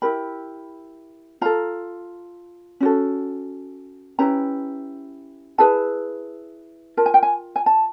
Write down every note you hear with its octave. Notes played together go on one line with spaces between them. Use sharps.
E4 G4 A#4 B5
F4 A4 A#5
C#4 F#4 A4
C#4 E4 G4 B4 A#5
E4 G#4 B4 A5
F4 A#4 A5
G#5
G5
G#5
G#5
A5